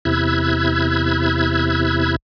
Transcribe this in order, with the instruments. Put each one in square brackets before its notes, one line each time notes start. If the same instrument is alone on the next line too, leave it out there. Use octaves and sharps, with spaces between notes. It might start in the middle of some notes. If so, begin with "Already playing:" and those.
[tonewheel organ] E2 C3 E4 E6 F#6 G#6